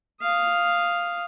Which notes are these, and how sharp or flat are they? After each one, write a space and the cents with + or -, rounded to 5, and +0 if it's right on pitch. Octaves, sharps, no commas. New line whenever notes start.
F5 +0 D#6 +0